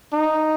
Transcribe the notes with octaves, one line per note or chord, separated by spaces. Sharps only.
D#4